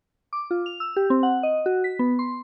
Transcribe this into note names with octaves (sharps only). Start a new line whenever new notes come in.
D6
F4
F7
E6
G4
C4
F#5
D#5
F#4
B6
B3
C6